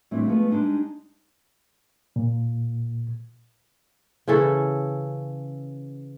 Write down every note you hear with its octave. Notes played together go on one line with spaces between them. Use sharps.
A2 E3 G3 C4 D4 E4
F3 G#3 A3 B3
G3 G#3 D4 D#4
A#2
C#3 E3 C#4 A4